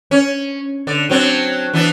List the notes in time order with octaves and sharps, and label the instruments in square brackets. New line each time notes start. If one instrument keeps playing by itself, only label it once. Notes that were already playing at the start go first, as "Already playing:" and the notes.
[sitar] C#4
D3 D5
F#3 C4 D4
E3 B3 D4